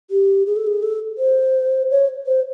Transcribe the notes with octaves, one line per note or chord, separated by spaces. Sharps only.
G4
G#4
A4
G#4
A4
C5
C#5
C5